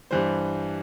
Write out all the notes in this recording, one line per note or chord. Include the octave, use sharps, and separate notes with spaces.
G2 E3 G3 C5